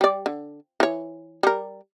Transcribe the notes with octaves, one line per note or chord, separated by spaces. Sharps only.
G3 D5
D3
E3 C#5
G3 A#4